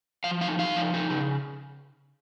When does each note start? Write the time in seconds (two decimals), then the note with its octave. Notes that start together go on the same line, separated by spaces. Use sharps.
0.24 F3 F5
0.41 D#4 F5
0.59 D#4 F5
0.76 F3
0.94 D#4
1.10 C#3